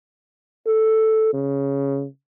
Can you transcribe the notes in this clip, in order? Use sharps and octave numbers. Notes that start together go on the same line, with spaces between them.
A4
C#3